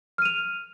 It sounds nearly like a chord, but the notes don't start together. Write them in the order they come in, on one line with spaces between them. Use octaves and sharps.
F6 D#7 F7